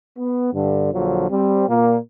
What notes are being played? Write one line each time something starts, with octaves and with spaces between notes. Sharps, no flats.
B3
G2 D3
A#1 D3 F3 F#3
G3 C4
A#2 A#3